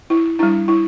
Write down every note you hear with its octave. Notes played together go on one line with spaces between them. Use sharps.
E4
G3 D4 E4
E4